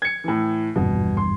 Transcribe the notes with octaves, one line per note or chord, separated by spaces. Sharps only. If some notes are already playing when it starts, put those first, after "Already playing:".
G#6 C#7
A2 E3
G#1 E2 G2 B2
C6